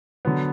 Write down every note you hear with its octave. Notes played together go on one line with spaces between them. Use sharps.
D3 F#3 B3